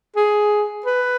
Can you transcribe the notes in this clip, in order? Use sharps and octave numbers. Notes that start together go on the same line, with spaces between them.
G#4
B4